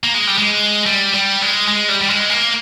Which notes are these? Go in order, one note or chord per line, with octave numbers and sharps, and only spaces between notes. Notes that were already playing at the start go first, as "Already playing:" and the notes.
A#3
G#3
G3
G#3
G3
G3
G#3
G#3
G3
G3
G#3
A#3